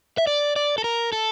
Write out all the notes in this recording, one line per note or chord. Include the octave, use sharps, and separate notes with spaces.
E5
D5
D5
A4
A#4
A4